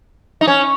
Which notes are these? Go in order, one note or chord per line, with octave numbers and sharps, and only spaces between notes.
D#4
C#4